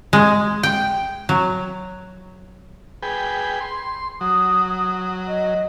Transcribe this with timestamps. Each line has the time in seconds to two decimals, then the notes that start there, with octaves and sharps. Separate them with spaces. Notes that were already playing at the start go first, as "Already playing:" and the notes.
0.13 G#3
0.63 G5
1.29 F#3
3.02 G#4 B4 G5
3.61 C6
4.21 F#3 D#6
5.28 D#5